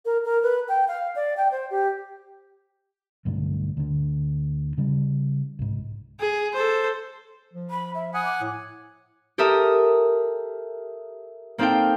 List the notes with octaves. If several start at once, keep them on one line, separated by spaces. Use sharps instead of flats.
A#4
A#4
B4
G5
F5
D5
G5
C5
G4
B1 G2 D3 A3
D2 D3
C#3 G3
C2 G#2
G#4
A4 C5
F3
B5
E5
F#5 G#5 D#6
D6
A2
G4 A4 A#4 E5 D#6
A#3 C4 D#4 A4 F5 G5